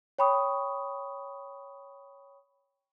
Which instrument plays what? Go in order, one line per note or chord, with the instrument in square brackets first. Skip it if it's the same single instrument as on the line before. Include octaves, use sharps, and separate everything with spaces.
[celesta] C#5 G5 B5 C#6 D#6